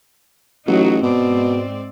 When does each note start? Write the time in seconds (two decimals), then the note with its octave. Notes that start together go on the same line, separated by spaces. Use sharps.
0.68 A1 F#3 D#4 F#4
1.03 G#2 B2 C4 D5